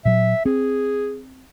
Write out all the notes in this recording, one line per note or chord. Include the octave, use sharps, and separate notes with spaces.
A#2 F#3 E5
C4 G#4